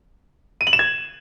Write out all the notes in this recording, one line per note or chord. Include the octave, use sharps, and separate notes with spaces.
D#7
F#7
E7
G#6